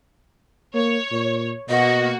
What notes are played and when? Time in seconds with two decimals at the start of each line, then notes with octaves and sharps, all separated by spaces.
0.75 A#3 C#5
1.11 A#2
1.69 B2 A#3 F#4 D#5